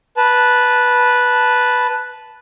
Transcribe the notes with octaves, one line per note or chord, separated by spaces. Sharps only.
B4 A5